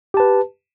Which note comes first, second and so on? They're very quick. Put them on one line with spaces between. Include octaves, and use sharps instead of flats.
G4 A5 B4